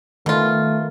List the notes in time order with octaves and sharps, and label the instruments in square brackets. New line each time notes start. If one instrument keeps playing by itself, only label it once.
[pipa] B2 F4 [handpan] D#3 [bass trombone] A3